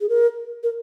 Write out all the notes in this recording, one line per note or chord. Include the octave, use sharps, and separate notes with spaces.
G#4
A#4
A#4